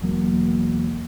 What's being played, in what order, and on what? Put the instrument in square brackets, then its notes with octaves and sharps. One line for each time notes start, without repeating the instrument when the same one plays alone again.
[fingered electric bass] E1 F#3 A#3